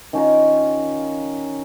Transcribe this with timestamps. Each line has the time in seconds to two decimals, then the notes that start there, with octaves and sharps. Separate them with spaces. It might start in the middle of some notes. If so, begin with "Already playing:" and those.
0.13 D#3 C#4 F4 A#4